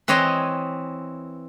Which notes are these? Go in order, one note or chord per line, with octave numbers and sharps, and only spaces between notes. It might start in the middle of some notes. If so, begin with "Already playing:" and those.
E3 C4 C#5 D#5 G#5 C6